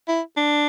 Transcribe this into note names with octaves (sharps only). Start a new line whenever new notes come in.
E4
D4